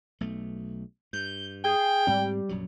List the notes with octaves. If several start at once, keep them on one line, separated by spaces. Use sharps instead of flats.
B1 A3
G2 G6
G#4 G5
G#2 G3 C4
A#1 F#2 F#3